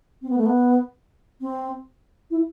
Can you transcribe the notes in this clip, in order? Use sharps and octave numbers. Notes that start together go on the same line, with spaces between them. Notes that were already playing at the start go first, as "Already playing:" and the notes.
C4
B3
A3
B3
C4
E4